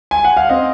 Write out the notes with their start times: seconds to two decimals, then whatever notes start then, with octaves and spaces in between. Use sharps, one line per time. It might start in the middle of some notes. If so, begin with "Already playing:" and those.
0.11 G#5
0.24 F#5
0.37 F5
0.50 C4 D#5